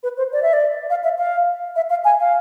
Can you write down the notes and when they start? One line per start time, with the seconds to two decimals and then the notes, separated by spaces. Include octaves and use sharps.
0.03 B4
0.17 C5
0.33 D5
0.43 E5
0.53 D5
0.90 F5
1.04 E5
1.18 F5
1.76 E5
1.90 F5
2.05 G#5
2.20 F5